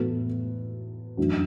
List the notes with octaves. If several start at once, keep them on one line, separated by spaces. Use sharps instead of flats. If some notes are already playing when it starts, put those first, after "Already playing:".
Already playing: A2 E3 B3 F#4 A4
F#2 E3 A3 D4 F#4